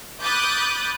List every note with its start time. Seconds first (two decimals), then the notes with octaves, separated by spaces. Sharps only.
0.24 B5 D6 D#6 F#6 G6 A6